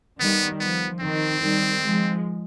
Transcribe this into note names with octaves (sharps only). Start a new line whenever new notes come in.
D#3 G3 B3
F3 B3
D#3 C4
D#3 G3
F3 G#3